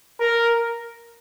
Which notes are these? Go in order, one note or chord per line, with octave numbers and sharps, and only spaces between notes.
A#4